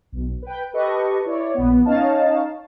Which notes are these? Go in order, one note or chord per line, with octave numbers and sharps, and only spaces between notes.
B1
B4 G5
G4 A4 B4 D#5 C#6
E4 C#5 D5
A#1 B3
C#4 D#4 C#5 D#5 F5 A5